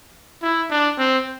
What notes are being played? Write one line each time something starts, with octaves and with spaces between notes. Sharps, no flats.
E4
D4
C4